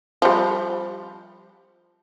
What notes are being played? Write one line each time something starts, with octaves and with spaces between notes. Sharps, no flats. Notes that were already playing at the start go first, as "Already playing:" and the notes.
F3 G3